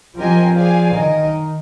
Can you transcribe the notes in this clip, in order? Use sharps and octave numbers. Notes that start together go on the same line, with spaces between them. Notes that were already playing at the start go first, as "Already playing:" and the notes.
F3 C4 G4 A#4 D#5 G#5
G#4 D5 F5 G#5
D#3 D#4 A#4 D#5